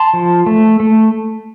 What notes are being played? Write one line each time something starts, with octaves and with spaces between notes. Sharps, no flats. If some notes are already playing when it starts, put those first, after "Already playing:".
Already playing: A5 C6
F3
A3
A3